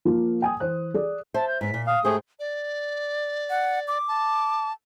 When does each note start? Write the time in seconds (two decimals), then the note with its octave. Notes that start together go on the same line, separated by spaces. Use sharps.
0.05 F3 A#3 F4
0.42 G5 G#5 D#6
0.60 E3 C5 F#6
0.94 G#4 D5
1.34 C5 E5 A5
1.48 G6
1.61 G#2 B3 B6
1.74 A#2
1.87 F5 D#6
2.05 G#2 A3 G4 G#4 C5
2.40 D5
3.50 F#5
3.88 D6
4.08 A5